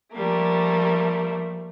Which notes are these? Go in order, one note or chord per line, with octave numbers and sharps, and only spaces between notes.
F3 G3 A3 A#3